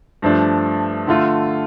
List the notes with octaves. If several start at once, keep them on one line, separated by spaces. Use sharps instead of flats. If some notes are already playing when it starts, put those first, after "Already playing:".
G2 F3 A3 D4
D3 A3 F4